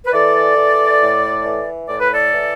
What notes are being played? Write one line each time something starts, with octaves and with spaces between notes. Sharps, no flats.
B4
E3 A4 D5
E3
A2
E3
A2 D5
B4
A4 D5
E3